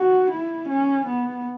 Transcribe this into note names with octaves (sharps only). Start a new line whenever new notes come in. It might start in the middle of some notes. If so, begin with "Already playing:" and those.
Already playing: F#4
E4
C#4
B3